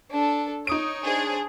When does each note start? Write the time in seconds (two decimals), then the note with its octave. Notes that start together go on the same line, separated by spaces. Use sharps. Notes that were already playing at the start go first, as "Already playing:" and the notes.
0.11 D4 A4
0.67 D#4 C#5 D#6 D7
1.03 D4 G#4 C5